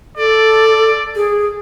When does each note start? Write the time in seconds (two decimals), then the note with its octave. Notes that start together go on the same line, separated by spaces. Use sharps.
0.17 A4 D5
1.16 G#4